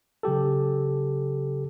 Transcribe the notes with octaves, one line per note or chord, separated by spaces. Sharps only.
C#3 F#3 G4 A4